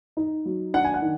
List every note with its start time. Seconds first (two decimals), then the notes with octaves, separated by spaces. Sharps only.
0.17 D#4
0.45 F#3
0.74 D4 F#5
0.84 G#5
0.94 F#5
1.02 D#3